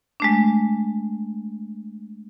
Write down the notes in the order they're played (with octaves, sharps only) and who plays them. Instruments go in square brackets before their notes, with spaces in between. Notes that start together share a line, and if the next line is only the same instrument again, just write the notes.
[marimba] G#3 A3 D4